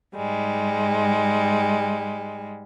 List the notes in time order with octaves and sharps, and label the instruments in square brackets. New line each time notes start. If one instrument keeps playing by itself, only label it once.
[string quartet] G#2 G3 G#3